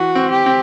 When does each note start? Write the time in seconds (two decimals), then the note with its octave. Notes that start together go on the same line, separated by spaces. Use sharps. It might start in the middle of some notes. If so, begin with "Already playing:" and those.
Already playing: E3 F#4
0.15 C4
0.31 G4
0.46 C4